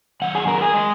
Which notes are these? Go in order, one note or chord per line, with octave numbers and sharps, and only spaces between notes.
F#2 D#3 F#5
G#4 G#5
A#4 A#5
G#4 G#5
D#3 G#3